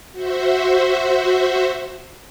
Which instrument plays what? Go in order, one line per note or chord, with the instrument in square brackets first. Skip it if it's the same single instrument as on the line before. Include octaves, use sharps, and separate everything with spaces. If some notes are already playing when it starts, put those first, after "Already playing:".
[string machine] F#4 C5 E5